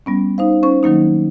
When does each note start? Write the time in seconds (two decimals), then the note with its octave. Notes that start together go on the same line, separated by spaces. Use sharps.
0.06 G3 B3 C#4
0.38 D#4 C5 F5
0.63 C#4 C5 C#6
0.83 D#3 F#3 A#3 D#4